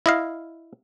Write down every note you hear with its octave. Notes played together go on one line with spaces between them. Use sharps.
E4 D#5 F5